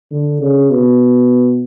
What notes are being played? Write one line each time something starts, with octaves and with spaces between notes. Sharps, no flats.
D3
C#3
B2